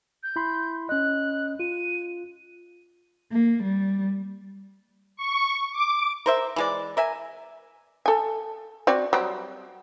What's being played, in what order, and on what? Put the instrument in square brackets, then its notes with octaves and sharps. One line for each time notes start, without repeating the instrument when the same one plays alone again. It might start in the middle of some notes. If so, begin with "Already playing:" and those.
[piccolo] G6
[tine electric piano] E4 B5 C6
[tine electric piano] C#4 D#5 [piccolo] F#6
[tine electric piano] F4 [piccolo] D#7
[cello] A#3
G3
[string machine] C#6
D6
[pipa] A#4 C5 E5
E3 G#3 D5
A#4 E5 G#5
[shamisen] A4 G#5
C4 F#4 D5
F#3 G3 C4